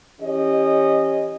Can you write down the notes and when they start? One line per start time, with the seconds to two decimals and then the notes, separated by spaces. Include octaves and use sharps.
0.21 E3 C#4 G4 D#5